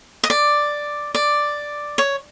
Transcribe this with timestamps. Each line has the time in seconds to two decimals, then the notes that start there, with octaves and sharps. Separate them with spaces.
0.24 D#5
0.30 D5
1.15 D5
1.98 C#5